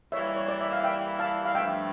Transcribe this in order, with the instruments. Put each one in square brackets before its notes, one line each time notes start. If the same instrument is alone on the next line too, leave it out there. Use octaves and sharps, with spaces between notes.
[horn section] E3 G3 A#3 E4 [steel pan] C#5 E5
[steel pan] C#5
D5
E5
F5
E5 G5
F5 A5
F5
[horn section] G2 F3 A3 [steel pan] E5 G5